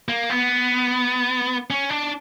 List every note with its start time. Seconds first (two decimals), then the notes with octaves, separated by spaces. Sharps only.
0.09 A#3
0.30 B3
1.70 C#4
1.90 D4